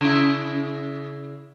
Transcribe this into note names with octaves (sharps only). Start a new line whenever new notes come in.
C#3 E4